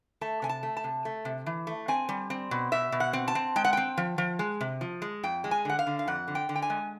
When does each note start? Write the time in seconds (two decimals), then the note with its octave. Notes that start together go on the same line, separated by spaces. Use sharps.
0.21 A3 A5
0.42 C3 G#5
0.49 A5
0.63 A3
0.77 A5
0.84 C3
1.05 A3
1.25 C3
1.46 E3
1.67 A3
1.88 C4 G#5
2.09 G3
2.30 C4
2.51 B2
2.72 B2 E5
2.92 B2
3.00 F#5
3.13 C4
3.28 A5
3.35 C4
3.56 G#3 G5
3.65 F#5
3.73 C4 G5
3.97 F3
4.18 F3
4.39 G#3
4.61 C3
4.81 F3
5.02 G#3
5.23 F2 G5
5.44 G#3
5.51 G#5
5.65 D3 F#5
5.79 F5
5.87 D3
5.99 F5
6.08 F2 F#5
6.28 D3
6.35 G5
6.49 D3
6.55 G5
6.62 G#5
6.70 G#3